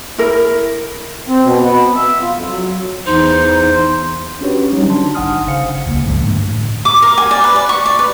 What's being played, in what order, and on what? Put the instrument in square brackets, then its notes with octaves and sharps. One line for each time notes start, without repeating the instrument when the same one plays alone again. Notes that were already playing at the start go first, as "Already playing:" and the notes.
[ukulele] E4 A#4
[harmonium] C4
B2
B3
E5
F4
F2
F#3
[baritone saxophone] E2 [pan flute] D#4 [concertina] C5
[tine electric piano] C#4 D4 F#4 G4 B4 C#5
F#3 G3 C#4 D#4 F#4
D3 D4 A5 C6
G#1 D#4 F#5 G#5 D#6 F6
G1 C#3 C5 F5 C#7
[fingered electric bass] D1 C#2 A#3
G2 D3 F3 G#3
A2 D3
[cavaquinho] D6
A#4
G#5
D5
B4
D5
C#6
D5
B4